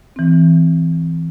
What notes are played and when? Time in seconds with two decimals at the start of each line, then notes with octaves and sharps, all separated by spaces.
0.16 E3 C4